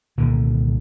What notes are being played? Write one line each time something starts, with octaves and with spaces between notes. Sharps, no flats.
C2 A#2 D3 D#3